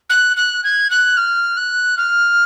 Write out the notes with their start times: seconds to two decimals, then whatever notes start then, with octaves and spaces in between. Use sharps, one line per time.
0.09 F#6
0.36 F#6
0.64 G#6
0.90 F#6
1.17 F6
1.57 F#6
1.97 F6